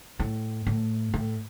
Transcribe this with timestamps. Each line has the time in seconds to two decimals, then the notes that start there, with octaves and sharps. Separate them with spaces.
0.19 A2
0.67 A2
1.14 A2